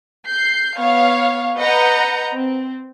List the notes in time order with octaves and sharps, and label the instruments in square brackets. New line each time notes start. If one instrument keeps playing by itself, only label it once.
[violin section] G6 C7
B3 C#5 F5
B4 D#5 F#5 A#5 G6 C#7
C4